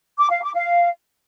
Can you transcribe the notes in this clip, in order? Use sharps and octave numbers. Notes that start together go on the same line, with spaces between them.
D6
F5
D6
F5